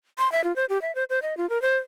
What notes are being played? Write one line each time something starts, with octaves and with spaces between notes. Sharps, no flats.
C6
E5
F4
C5
G4
E5
C5
C5
D#5
F4
A#4
C5